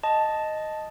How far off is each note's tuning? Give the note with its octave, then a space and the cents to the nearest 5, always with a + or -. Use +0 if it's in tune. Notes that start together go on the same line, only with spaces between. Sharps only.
D#5 +0 A5 -5